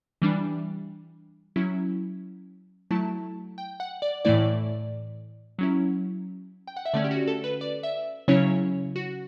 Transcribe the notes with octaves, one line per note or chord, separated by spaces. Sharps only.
E3 G3 D4
F#3 C#4 E4
F#3 A3 E4 A5
G5
F#5
D5
A2 E3 A3 E4 D5
F#3 C#4 E4
G5
F#5
E5
D3 A3 C#4 D5
G4
F#4
A4
B4
D5
E5
C#3 F#3 C#4 E4 C#5
F#4